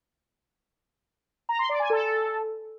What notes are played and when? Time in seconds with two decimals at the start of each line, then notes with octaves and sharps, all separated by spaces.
1.49 A#5
1.59 C6
1.69 D5
1.80 G#5
1.90 A4